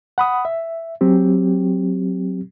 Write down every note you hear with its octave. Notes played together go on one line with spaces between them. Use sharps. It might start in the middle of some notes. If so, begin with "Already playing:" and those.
F#5 B5 D#6
E5
F#3 C4 G4